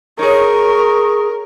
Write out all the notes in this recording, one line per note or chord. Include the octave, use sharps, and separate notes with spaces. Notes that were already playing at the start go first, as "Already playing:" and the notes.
D#4 G#4 A#4 C#5 C#6